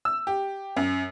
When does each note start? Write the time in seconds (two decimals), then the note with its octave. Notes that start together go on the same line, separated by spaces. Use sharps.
0.05 E6
0.27 G4
0.77 F#2